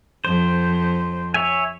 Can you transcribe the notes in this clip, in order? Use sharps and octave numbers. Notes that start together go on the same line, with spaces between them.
F2 C5
C#5 E5 G#5